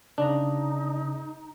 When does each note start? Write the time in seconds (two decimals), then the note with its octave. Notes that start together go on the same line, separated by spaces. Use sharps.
0.18 C#3 D4 D#4 A#5